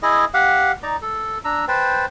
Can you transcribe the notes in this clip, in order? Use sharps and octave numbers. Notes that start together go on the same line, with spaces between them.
E4 G#4 D#5
G4 F5 F#5
D#4 D5 A#5
A4
D4 A#5 E6
B4 C5 G5 A5